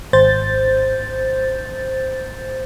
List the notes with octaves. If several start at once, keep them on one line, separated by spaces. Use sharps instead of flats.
G#1 C5 G6 A6